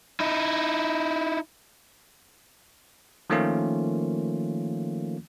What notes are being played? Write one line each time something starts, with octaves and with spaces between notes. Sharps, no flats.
D#4 E4
D#3 F3 A3 A#3 C#4 F4